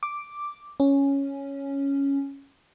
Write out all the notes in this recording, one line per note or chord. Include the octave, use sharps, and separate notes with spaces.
D6
C#4